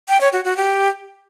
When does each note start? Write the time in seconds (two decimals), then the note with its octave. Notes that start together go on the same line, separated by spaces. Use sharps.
0.09 G5
0.21 C#5
0.33 F#4
0.45 F#4
0.57 G4